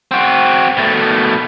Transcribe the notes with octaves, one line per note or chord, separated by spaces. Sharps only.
C4 F#4
B2 A3